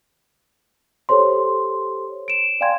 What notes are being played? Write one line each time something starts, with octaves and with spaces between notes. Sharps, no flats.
G4 A4 C5 C#5 C6
D7 E7
D5 F5 G5 G#5 C6 G#6